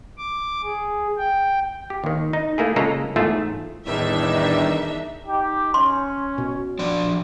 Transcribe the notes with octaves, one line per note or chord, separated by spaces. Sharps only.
D6
G#4
G5
G4
D#2 D#3
D#4
A3 A#3 E4 G#4
C#3 G#3 A#3 F4 A4 A#5
E2 G#2 A3 F4 E5 A5
E2 A2 D#3 G3 D4 D#4 E5
D#4 G4
C#4 C6
B2
F3 D4 D5